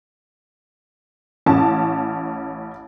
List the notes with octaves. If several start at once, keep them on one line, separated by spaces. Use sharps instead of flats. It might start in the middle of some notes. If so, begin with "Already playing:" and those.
A1 C#4 A5